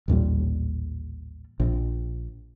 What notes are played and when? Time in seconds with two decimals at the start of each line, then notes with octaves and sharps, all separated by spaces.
0.08 A1 D#2 A#2 G3
1.60 A#1